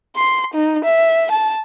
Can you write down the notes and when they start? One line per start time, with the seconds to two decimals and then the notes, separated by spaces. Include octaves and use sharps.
0.16 C6
0.54 D#4
0.85 E5
1.32 A5